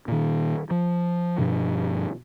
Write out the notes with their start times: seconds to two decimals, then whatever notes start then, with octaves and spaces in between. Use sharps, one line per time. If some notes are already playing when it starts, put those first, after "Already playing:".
0.08 A#2 D#3
0.71 F3
1.38 G2 B2 F3 D4